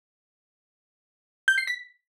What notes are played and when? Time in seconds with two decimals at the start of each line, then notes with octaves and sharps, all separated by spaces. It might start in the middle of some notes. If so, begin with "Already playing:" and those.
1.48 G6
1.58 C7
1.67 B6